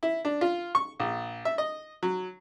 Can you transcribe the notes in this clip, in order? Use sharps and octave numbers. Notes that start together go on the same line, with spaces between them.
E4
D4
F4
C#6
A#1
E5
D#5
F#3